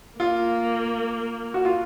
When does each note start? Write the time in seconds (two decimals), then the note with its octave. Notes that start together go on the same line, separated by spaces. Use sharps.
0.19 A#3 F4
1.54 F#4
1.65 F4